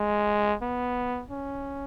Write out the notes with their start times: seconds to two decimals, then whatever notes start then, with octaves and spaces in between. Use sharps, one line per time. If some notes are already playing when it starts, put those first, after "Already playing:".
Already playing: G#3
0.62 B3
1.31 C#4